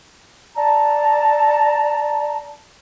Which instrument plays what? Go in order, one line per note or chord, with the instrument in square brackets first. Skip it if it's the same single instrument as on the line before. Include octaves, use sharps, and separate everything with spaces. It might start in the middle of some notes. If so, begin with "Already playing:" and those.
[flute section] D5 A5 A#5